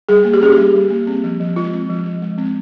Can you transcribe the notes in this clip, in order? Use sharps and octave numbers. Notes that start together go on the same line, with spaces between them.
G3 G#4
A#3
G4
C#4 G#4
G4
G3
G3
A#3
C4
F3
F3
G#3 F4
C4
F3
F3
G#3
C4